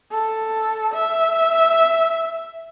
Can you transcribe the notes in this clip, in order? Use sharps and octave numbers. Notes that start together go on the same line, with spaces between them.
A4
E5